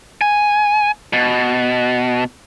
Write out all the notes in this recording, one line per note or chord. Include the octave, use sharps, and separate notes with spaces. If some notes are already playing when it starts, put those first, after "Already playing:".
G#5
B2